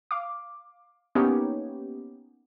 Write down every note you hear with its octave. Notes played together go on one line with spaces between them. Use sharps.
F5 D6
A#3 B3 C#4 D#4 G4 C#5